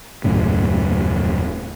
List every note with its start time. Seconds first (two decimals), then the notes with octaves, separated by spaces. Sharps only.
0.24 D#1 F#2 A2 C#3